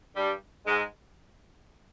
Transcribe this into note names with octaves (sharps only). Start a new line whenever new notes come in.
G2 G3
G#2 G#3